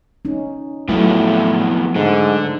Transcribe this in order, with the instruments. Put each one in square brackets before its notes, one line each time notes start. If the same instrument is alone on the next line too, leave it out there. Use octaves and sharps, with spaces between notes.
[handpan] C#4 D#4
[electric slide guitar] F2 B3 E4 [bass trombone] A2 [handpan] F#3 A3 F4
[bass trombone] G#2 [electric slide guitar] D3